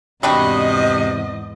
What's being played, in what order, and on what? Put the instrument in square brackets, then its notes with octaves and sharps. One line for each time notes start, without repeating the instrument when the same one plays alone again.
[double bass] E2 G#2 [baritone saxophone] C3 [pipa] G3 D4 F#4 [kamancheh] D#5